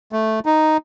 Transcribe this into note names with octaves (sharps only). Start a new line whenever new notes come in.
A3
D#4